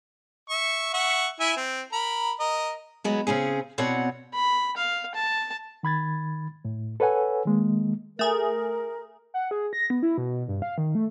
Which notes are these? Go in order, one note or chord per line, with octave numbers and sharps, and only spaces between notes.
E5 C#6
E5 F#5 C#6
E4 E5 G#5
C4
A#4 B5
A#4 D#5
F#3 G#3 B3
C#3 C4 C#4 G#4
B2 C4 C#5 D5 F#5
B5
F5
A5
D#3 B5 G#6 A6
A2
A4 B4 C#5 F#5 G#5
D#3 G#3 A#3
A3 G#4 A#4
F#5
G#4
A#6
B3
E4
B2
G2
F5
D#3
A3